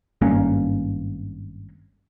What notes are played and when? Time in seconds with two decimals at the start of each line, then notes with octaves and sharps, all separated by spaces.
0.21 G#1 G2 A#3 C#4